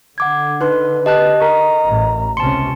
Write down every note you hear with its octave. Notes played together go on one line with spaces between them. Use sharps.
D3 F#5 D6 G#6
D#4 B4 C6 F#6
G4 D#5 A5 F#6
A#4 A#5 C#6
A1
C#2 C3 C#4 A5 C6 C#7